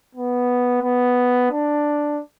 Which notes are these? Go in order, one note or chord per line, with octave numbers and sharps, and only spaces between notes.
B3
B3
D4